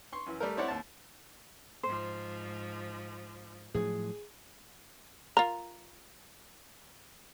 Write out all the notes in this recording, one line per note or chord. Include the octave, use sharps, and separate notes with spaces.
C6 C#6
F#2 E3
G3 A3 A#4
C4 E4 C#5 D5 F#5
D#2 A5
G#2 F3 C5
A2 F3 F#3 G#4
F4 A#4 A#5